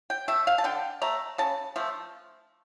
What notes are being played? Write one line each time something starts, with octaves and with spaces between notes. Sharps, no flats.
G5
A3 E5
F5
A5
D3 G5
A3 A#5
C#3 A5
F3 A3